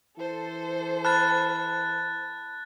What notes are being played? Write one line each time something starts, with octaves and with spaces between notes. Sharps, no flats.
E3 A4 C5
A5 B5 F6 F#6 A6